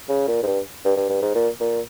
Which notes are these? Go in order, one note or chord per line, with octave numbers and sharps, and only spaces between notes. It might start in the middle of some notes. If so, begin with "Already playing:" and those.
C#3
A#2
G#2
G2
G2
G2
G2
G#2
A#2
A#2